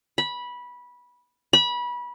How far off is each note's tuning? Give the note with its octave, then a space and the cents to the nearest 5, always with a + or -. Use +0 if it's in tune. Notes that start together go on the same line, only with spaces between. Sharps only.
B5 -15
B5 -25